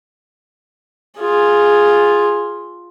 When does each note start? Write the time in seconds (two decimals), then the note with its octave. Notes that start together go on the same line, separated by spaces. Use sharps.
1.19 F4 G#4